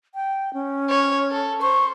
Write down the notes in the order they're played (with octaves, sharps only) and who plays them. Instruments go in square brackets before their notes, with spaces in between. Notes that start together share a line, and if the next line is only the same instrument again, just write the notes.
[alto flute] G5
C#4
[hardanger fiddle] C#5
A4
[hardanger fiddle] C5 [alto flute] C#6